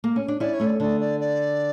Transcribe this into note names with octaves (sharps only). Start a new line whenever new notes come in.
A#3
C#4
D4
C#4 E4 D5
C#5
A3 C#4
D5
D3 D5
D5
D5